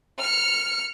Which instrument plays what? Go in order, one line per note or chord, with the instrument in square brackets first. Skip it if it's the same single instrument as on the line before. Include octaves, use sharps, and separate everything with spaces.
[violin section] F6 C#7